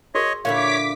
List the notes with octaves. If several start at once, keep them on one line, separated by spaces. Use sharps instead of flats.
F#4 G#4 A#4 C#5 D#5
A#2 D3 E4 C#5 F5 D6 B6